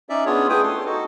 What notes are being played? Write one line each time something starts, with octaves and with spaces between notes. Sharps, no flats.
C#4 D#4 D5 E5
B3 C#4 D4 F4 G#4 C#5
A3 E4 G#4 B4 G5 D#6
A4 C6
D#4 F#4 A4